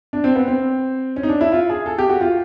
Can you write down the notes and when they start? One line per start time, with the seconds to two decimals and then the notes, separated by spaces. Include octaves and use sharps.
0.13 D4
0.24 C4
0.36 B3
0.48 C4
1.16 C#4
1.23 D#4
1.29 D4
1.41 E4
1.52 F4
1.70 G#4
1.86 A4
1.98 G4
2.09 F#4
2.21 F4